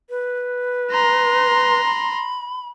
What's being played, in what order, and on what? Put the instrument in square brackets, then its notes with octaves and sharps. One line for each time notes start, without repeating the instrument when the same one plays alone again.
[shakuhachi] B4
[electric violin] A#5 C6
[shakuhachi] B5